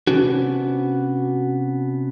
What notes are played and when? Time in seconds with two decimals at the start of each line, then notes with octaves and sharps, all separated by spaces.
0.07 C3 F#3 B3 C#4 D4 F#4